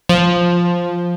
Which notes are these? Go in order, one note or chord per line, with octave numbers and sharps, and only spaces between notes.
F3